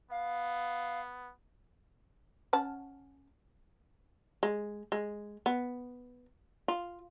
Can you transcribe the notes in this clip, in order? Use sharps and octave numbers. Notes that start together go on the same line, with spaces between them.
B3 F5
C#4 F#5 A5
G#3
G#3
B3
F4